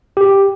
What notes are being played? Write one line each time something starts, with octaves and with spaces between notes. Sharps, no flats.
G4